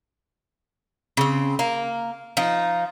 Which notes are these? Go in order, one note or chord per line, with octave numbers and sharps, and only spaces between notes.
C#3 C4
A#3
F3 D#4